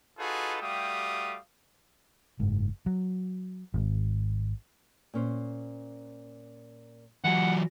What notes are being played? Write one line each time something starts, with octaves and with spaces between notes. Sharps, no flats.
D#4 F4 F#4 G#4 A4 B4
G3 A3 F#4 G4 F5 D#6
F#1 G#2
F#3
G#1 G#2
A#2 C#4 C5
E3 F#3 F#5